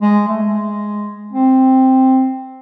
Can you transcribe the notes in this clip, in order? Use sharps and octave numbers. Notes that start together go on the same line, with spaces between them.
G#3
A3
G#3
C4